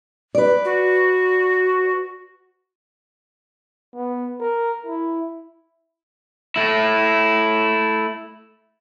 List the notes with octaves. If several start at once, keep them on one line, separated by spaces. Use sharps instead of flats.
B4 D5
F#4
B3
A#4
E4
A3 E4